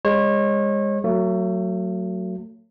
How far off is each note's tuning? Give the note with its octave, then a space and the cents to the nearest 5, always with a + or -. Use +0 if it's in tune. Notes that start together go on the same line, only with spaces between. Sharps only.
G#3 -30 C#5 -35
F#3 +0 A3 +35